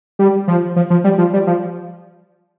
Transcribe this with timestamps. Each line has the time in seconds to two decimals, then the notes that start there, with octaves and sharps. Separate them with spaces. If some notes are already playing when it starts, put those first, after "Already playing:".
0.19 G3
0.48 F3
0.76 F3
0.90 F3
1.04 G3
1.18 F3
1.33 G3
1.47 F3